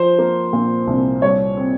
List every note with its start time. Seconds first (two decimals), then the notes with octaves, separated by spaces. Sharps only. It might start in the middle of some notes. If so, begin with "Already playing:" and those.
Already playing: F3 C5
0.19 A#3
0.53 A#2
0.87 C2
1.22 G3 C#5
1.57 C4